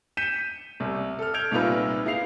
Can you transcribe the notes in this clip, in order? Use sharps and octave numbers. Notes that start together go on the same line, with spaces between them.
G6 B6 C#7 D#7 E7
C2
A4 F6
F6 G6 G#6 D7 F7
C2 A#2 D#4 F4 B4 E6
G#3 E4 F5 C7 F7